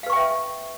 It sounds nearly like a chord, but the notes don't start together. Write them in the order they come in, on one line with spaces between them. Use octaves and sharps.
F5 B4 C#6 G5 E5